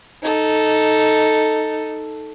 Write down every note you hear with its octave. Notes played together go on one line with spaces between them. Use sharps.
D#4 A4